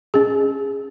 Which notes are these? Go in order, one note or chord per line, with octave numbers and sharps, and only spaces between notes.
C#4 G#4